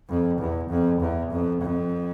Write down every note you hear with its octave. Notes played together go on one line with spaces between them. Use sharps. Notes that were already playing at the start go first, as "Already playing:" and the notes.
F2
E2
F2
E2
F2
F2